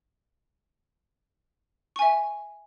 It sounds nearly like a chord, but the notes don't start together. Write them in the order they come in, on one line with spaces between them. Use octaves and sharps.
C#6 G#5 E5